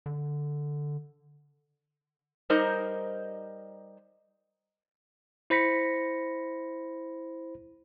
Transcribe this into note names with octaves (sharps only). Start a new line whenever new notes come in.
D3
G3 D#4 A#4 C5 D#5
E4 C5 B5 A#6 B6 C#7